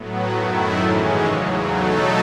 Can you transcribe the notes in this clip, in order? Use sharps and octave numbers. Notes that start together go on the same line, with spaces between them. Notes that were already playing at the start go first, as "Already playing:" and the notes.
Already playing: A2 F#3 B3
F#2 D#3 F#3 A3 E4
G#2 E3 G#3 C#4
E2 C#3 F#3
B2 F#3 A3 D#4 A4